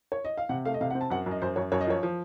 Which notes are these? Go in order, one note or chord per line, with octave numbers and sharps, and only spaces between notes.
C#5
D#5
F5
C3 F#5
A3 F5
D#5
C3 F5
F#5
C4
A5
F#2 F#5
F#2
D#5
F#2 C5
F#2 C#5
F#2 C#5
D#5
F3 C#5
F3